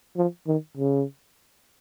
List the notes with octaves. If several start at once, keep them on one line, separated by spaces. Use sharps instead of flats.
F3
D#3
C#3